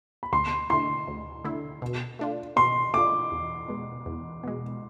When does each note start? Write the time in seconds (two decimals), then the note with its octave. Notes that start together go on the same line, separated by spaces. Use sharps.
0.23 B5
0.33 D2 C6
0.70 D3 A3 E4 C6
1.07 D2
1.44 D3 A3 E4
1.82 B2
2.19 A3 D4 F4
2.56 B2 C6
2.94 A3 D4 F4 D6
3.31 E2
3.68 B2 G#3
4.06 E2
4.43 B2 G#3